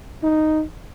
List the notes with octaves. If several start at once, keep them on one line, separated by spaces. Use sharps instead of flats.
D#4